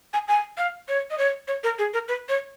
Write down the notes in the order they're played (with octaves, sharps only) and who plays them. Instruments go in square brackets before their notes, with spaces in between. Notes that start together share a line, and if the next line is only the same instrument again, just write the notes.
[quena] G#5
G#5
F5
C#5
D#5
C#5
C#5
A#4
G#4
A#4
B4
C#5